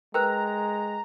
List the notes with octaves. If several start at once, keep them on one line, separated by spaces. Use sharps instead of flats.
G#3 A#4 B4 G5 A#5 F#6